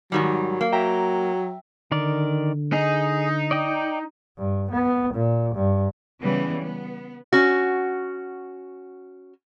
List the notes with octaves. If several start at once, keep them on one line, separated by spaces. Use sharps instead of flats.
G#2 D#3 F#3 G3
A#3
F#3 E5 G5 A#5
D3 D#3 A#4 D5
D#4 G#4
D5 D#5 G5
G2
B3
A#2
G2
C#3 E3 G3 B3
B3
C#4 F#4